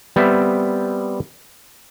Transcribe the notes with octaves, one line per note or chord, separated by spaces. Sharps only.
G3 B3 C4 E5